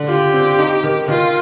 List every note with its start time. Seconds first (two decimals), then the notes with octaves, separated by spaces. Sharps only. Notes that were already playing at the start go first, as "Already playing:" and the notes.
Already playing: D3
0.08 F4 G4
0.33 C4
0.58 D#4
0.83 D#3
1.08 D#3 F4